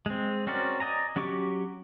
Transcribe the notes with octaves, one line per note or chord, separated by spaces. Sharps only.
G#3 C4
C4 C#4 F#4 A#4 D5
D5 D#5 G#5 A#5
F#3 C#4 G4 C#6 D6